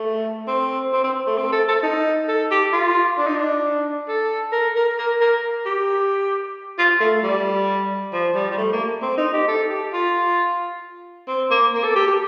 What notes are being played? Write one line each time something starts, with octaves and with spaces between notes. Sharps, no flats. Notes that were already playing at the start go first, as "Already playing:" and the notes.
Already playing: A3
C4
C4
C4
A3
C4
A4
A4
D#4
A4
G4
F4
D4
D#4
D4
A4
A#4
A#4
A#4
A#4
G4
F4
A3
G3
F3
G3
G3
A3
A#3
C4
D#4
G4
A4
G4
F4
C4
A#3
A#3
A4
G4
G4